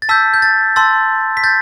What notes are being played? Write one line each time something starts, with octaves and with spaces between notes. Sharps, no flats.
A6
A5 E6 G6 B6
G6
A6
A5 C6 E6 A6
B6
G6 A6